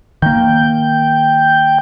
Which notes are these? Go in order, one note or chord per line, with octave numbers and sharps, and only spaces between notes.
D#3 A#3 G5